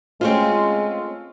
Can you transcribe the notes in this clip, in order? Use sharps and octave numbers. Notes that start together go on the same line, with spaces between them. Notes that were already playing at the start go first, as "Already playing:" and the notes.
G#3 A3 C4 C#4 F4 C5